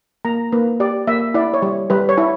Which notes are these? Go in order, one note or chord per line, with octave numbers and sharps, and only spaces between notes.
A#3 A#5
A#3 B4
G4 D5
A#3 E5
E4 D5
C#5
G3
G3 B4
C#5
E4